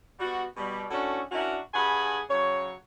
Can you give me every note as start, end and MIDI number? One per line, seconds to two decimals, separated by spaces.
0.20 0.45 55
0.20 0.45 59
0.20 0.45 66
0.57 0.85 47
0.57 0.85 55
0.90 1.20 45
0.90 1.20 61
0.90 1.20 62
0.90 1.20 66
0.90 1.20 69
1.32 1.58 61
1.32 1.58 62
1.32 1.58 64
1.32 1.58 66
1.32 1.58 70
1.73 2.19 43
1.73 2.19 68
1.73 2.19 78
1.73 2.19 80
1.73 2.19 83
2.30 2.73 49
2.30 2.73 54
2.30 2.73 73